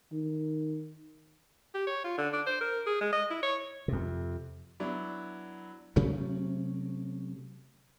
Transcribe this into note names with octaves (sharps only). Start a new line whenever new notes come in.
D#3
G4
C#5
F4
D3
D4
C5
A#4
G#4
G#3
D#5
E4
C#5
F2 C3
F#3 B3 D4 E4
C3 F#3 A3 C#4